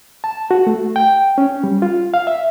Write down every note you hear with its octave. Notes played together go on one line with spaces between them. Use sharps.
A5
F#4
A3
G5
C#4
G3
F4
F5
E5